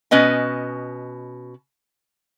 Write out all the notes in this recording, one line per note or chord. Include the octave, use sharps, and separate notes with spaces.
B2 C#4 B4 D#5 G#5